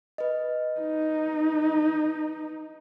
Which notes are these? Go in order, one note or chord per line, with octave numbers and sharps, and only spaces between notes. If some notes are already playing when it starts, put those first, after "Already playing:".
B4 D#5
D#4